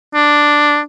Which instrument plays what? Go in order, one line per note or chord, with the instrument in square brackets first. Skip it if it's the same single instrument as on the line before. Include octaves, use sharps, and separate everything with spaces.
[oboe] D4